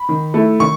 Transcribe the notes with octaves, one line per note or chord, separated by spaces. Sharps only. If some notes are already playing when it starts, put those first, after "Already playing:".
Already playing: B5
D#3
A3 E4
D#3 C#6